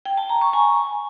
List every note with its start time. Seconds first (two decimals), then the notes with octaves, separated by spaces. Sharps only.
0.05 G5
0.17 A5
0.29 A#5
0.41 C#6
0.53 G#5